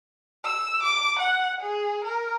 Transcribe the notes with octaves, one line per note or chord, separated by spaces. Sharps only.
E6
D6
F#5
G#4
A#4